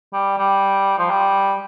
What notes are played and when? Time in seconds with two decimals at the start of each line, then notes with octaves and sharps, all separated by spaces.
0.13 G3
0.38 G3
0.98 F3
1.10 G3